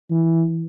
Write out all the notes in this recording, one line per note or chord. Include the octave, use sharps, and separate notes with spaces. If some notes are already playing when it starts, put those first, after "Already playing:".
E3